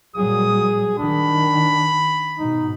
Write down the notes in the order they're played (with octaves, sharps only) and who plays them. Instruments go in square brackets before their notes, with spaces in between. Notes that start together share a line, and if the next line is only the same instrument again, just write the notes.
[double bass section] A#2 F#3 G3 [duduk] G#4 [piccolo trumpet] D#6
[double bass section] D#3 [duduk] D4 [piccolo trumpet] B5
[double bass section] G#2 B2 [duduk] D#4